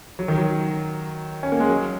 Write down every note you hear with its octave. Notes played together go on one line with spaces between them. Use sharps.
F#3
D#3
F#3
C#4
A#3
G#3
F#3